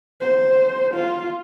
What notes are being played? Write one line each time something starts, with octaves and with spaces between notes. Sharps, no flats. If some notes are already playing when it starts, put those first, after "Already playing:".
C5
F4